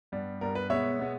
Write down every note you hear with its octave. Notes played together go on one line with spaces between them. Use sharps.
G2 G3 B3
G2 G3 B3 A#4
B4
B2 G#3 B3 C#5 E5
B2 G#3 B3